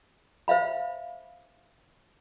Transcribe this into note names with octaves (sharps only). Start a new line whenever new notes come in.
C5 E5 F5 B5